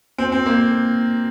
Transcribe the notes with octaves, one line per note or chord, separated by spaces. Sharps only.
C4
C4
A#3